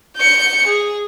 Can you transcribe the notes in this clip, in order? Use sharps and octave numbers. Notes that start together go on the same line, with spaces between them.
G6 C#7
G#4